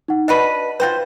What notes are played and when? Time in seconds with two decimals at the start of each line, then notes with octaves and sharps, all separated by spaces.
0.08 D#4 F#5
0.28 D4 F#4 B4 D#5 D#7
0.80 F4 F#4 B4 C5 G5 G6